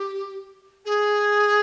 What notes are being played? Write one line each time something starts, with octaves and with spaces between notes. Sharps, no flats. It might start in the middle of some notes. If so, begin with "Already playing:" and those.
Already playing: G4
G#4